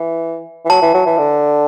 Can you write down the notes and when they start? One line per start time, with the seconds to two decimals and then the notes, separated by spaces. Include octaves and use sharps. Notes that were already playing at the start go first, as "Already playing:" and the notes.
Already playing: E3
0.65 E3
0.70 F#3 A5
0.82 E3
0.94 F#3
1.06 E3
1.18 D3